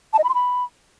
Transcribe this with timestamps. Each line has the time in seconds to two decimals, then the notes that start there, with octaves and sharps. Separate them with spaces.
0.13 A5
0.19 D#5
0.24 B5
0.29 C6
0.34 B5